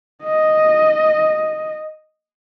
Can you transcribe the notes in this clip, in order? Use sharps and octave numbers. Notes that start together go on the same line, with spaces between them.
D#5